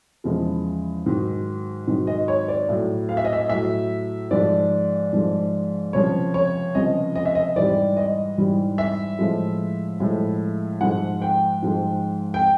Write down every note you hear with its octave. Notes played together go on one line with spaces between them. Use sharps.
E2 C#3 F3 G#3
G#2 D#3 F#3
G#2 D#3 F#3
D#5
C#5
D5
A2 F#3
F5
E5
D#5
E5
A2 F#3 E5
G#2 F3 G#3 D5
G#2 F3 G#3
C#2 C3 F3 C#5
C#5
C#2 C3 F3 D#5
D#5
E5
D#5
G#2 E3 G3 D5
D#5
G#2 E3 G3
E5
A2 F3 G#3
A2 F3 G#3
G#2 F3 G#3 F#5
G5
G#2 F3 G#3
G5